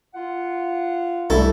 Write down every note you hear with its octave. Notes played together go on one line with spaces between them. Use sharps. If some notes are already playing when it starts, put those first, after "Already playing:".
F4 F#5
C2 G#2 G3 A3 E4 A4